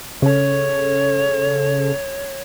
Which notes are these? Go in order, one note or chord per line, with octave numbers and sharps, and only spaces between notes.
C#3 A4 C#5